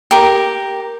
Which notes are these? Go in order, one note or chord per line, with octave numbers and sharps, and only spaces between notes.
G4 A#4